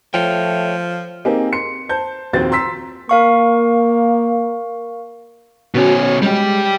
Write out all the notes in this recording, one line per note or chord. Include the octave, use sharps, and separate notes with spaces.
F3 A3 C#5 G5
A#3 C4 D#4 G4 G#4
C6 C#7
C5 A5 G6
A#1 D#2 C4 F#4 C5 A6
A#5 C6 E6 B6
A#3 A#4 F5 C#6
B2 C#4 F#4
C#5
G3 G#3 G4